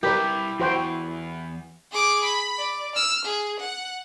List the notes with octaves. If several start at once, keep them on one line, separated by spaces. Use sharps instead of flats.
G3 E4 G4 A#4 B4 D5 E5
E2 E3 F#4 C5 G5
G#4 D6
B5
D5
E6 F6
G#4
F#5